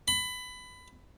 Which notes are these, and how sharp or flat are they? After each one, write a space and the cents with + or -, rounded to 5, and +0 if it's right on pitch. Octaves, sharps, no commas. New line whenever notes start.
B5 +20